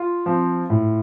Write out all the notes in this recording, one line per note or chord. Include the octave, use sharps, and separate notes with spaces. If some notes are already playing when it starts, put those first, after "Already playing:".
Already playing: F4
F3 C4
A2